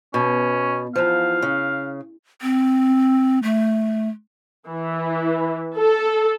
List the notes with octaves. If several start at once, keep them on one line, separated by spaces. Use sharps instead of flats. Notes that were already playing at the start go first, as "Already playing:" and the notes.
B2 C#4
E2 F3 F5
C#3
C4
A3
E3
A4